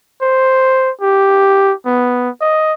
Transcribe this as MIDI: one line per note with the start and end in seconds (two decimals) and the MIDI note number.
0.22 0.91 72
1.01 1.73 67
1.86 2.30 59
2.42 2.73 75